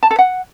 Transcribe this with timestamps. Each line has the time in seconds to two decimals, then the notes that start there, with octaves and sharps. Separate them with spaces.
0.03 A5
0.11 A4
0.19 F#5